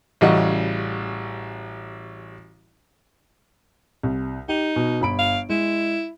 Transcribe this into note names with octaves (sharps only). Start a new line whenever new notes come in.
A1 C#3 G3 F#4 D#5
C2
D#4 G4
B2
G1 B5 D7
F5
G#3 E4